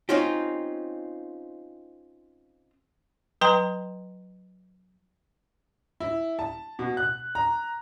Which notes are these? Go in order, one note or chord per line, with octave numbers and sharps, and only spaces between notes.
C4 C#4 D#4 F4 G4
F#3 B4 G5 A#5 C6
E4
A5
B2
F#6
A#5